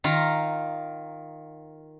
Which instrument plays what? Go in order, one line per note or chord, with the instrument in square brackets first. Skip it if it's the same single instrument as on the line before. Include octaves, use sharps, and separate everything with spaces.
[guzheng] D#3 F4 A#5